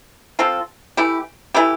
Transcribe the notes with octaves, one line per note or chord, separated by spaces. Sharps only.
F3 C4 F4 A4
E3 A3 E4 G4
E3 A3 E4 G4